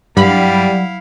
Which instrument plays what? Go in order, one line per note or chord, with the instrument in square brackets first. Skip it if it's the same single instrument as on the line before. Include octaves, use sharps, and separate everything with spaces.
[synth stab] G2 B5 [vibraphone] F#3 [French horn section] G3 [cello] E4 F5